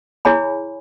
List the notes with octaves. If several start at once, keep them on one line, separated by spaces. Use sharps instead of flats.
E4 G#4 C#5 G#5 B5